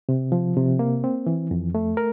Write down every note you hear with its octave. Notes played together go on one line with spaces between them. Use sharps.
C3
F3
C3
A#3
C4
E3
F2
A3
A#4